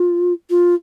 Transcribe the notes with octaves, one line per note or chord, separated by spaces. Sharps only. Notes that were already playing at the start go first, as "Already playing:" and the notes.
Already playing: F4
F4